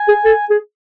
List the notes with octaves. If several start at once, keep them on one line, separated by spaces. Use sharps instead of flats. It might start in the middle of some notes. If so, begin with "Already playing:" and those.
Already playing: G#5
G#4
A4
G#4